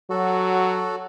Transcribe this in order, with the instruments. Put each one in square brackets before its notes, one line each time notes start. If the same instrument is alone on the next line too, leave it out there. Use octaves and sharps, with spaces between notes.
[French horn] F#3 [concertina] F#4 A4